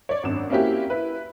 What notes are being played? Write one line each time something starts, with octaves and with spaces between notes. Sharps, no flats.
C#5 D5
G#1 F#2 D4 E7
A#3 C4 C#4 E4 F#4 G4
E4 B4